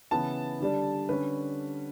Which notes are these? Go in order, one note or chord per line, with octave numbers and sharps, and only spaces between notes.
C#3 E3 B3 A5
D3 G3 D4
D3 G3 C#4 B4